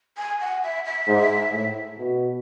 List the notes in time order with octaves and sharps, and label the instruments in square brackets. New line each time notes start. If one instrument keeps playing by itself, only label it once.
[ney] G#5
F#5
E5
E5
[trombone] G#2
A2
B2